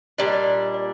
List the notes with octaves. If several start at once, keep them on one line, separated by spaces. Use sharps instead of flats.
A#2 G3 D4 D5
D#5
D5
D5
D5